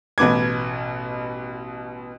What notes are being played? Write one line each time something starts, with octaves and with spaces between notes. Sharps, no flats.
A1 B2 B3 D6 G#6